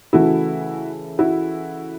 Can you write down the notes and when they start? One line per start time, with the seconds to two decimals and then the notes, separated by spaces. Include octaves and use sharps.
0.13 C#3 E3 A3 E4 F#4
1.19 E4 F#4